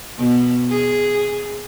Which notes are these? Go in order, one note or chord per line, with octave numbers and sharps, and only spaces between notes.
B2
G#4